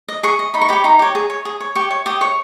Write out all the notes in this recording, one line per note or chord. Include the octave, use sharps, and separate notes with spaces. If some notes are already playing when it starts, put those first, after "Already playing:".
D#5
G#4 C#6
D#5
D#4 B5
C#6
G4 C#5 B5
D#4 A#5
G4 C#5
G#4
C#5
G#4
C#5
G4 C#6
C#5
G4 D#6
C#5 C#6